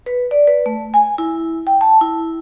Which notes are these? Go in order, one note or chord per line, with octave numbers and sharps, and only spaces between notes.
B4
D5
B4
A3
G#5
E4
G5
A5
E4